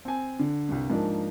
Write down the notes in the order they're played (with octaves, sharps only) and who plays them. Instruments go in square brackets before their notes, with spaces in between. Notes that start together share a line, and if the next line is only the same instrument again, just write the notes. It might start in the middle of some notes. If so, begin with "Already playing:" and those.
[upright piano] C4 G#5
D3
C2 G2
G#2 F3 A#3 D4